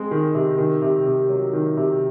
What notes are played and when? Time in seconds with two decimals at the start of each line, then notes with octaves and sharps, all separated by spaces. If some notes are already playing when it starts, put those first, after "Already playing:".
Already playing: G#3 C4
0.11 D#3
0.34 C3
0.58 D#3
0.82 C3
1.06 C3
1.29 F#3
1.53 D#3
1.77 C3